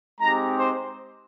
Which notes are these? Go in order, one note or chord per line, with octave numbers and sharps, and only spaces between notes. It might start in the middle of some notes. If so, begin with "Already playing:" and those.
G#3 C4 D#4 G4 A#5
C5